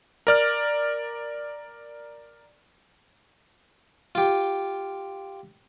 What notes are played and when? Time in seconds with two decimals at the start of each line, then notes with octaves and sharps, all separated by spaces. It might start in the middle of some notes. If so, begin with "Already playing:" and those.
0.27 A#4 D5 F6
4.15 F4 G4